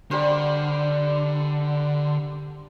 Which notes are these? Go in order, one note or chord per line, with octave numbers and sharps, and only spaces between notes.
D3 G3 A#4 C5